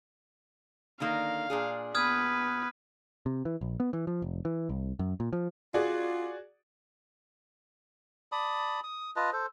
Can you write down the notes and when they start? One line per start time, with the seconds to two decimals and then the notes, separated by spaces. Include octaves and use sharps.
1.00 D3 D#3 A#3 F5
1.50 A#2 D4 G#4
1.95 B3 B4 D#6 F6 G#6
3.26 C3
3.45 E3
3.61 A#1
3.80 B3
3.93 E3
4.07 F3
4.22 F1
4.45 E3
4.69 C2
4.99 F#2
5.20 A#2
5.33 F3
5.74 F4 F#4 G#4 D5
8.32 D5 A5 B5 D#6
8.84 D#6
9.16 F4 B4 D#5 A5
9.33 A4 C5